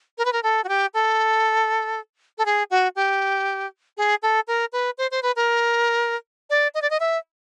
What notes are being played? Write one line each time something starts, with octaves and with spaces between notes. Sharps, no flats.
A#4
B4
A#4
A4
F#4
G4
A4
A4
G#4
F#4
G4
G#4
A4
A#4
B4
C5
C5
B4
A#4
D5
D#5
D5
D#5
E5